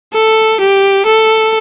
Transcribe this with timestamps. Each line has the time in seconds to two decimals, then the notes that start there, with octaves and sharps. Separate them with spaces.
0.13 A4
0.60 G4
1.06 A4